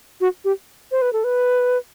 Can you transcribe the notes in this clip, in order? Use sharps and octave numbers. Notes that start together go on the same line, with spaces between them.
F#4
G4
C5
B4
A4
B4